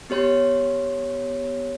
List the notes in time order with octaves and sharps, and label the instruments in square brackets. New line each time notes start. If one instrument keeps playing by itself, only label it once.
[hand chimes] B3 G4 C#5 C6